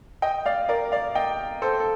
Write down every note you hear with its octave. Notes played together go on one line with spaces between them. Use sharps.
D#5 G5
D5 F5
A#4 D5
D5 F5
D#5 G5
A4 C5
A4